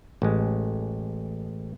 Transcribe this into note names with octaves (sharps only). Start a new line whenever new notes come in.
A1 G#3